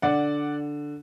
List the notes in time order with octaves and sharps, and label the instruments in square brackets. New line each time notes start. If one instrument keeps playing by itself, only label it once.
[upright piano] D3 D5 F#5